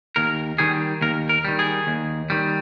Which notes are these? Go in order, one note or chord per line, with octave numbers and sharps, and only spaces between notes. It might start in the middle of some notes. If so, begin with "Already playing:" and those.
D#2 A#4
D#3 G3 G#4
D#2 A#4
A#4
D#3 G3
G#4
D#2
D#3 G3